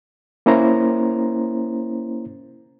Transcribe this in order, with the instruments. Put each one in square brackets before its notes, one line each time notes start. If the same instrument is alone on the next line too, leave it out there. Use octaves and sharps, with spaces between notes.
[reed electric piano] A#3 C#4 E4 C5 A#5